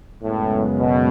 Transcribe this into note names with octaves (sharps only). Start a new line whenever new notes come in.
F#2 A2 C#3 G#3 B3
B2